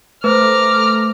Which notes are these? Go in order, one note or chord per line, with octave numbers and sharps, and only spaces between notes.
A3 B4 C5 A#5 D6 F6